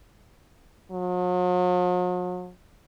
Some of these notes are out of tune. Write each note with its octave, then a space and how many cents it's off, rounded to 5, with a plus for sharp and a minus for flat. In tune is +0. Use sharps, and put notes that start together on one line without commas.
F#3 -45